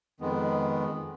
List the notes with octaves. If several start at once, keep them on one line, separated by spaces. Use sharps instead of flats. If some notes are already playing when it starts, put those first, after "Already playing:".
F2 D#3 G#3 B3